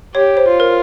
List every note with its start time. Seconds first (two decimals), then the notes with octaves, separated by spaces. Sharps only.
0.15 G4 C#5
0.37 C5
0.49 F4
0.60 A#4